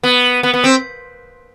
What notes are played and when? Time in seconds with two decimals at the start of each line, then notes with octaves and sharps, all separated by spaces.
0.03 B3
0.43 B3
0.54 B3
0.64 C4